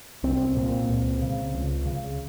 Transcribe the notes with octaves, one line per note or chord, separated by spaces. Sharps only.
C2 C4
A#2
C#2
C#3
C#2
C#3